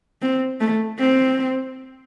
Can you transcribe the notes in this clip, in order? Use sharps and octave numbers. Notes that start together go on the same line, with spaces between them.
C4
A3
C4